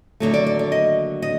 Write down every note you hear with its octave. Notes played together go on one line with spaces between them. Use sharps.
D#2 D3 F#3 A3
D5
D5
D5
D#5
D#5